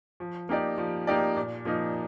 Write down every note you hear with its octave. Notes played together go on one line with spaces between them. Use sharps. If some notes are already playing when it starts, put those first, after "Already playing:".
F3
A#3 D#4 G4 D5
F3
A#3 D#4 G4 D5
A#2
F3 A#3 D#4